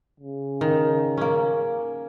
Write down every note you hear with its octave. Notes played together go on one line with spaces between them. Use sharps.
C#3
D#3
A#3 C#4